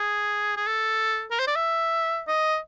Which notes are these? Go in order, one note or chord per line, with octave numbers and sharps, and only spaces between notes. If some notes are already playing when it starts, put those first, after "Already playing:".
Already playing: G#4
G#4
A4
A#4
C5
D5
E5
D#5